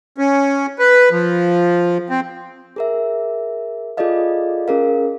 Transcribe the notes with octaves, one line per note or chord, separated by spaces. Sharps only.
C#4
B4
F3
C4
G#4 A#4 E5
F4 G#4 A4 D5 D#5 F5
C#4 G#4 A#4 F5